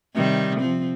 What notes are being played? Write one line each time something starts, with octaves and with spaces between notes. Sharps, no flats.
C3 D#3 G3
F3 C4